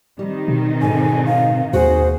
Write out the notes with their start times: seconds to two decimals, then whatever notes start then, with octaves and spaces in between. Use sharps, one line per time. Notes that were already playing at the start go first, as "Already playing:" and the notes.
0.19 D#3 G3 C4 D#4
0.48 B2
0.81 G#2 D3 G#5
1.26 F5
1.73 D#2 F#4 G#4 C5 F#5